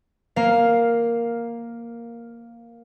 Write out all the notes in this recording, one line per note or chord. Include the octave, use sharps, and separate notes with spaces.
A#3 F5